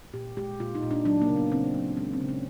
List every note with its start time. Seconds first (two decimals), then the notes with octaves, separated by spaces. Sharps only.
0.14 A#2 G4
0.37 G#3 G4
0.60 A#2 F4
0.75 D#4
0.83 A#2
0.91 D4
1.05 F#3 D4
1.22 A#3
1.28 C#3
1.36 B3
1.52 C#3 C4
1.74 F#3
1.97 G#3 C#4
2.13 C4
2.21 C#3
2.29 C#4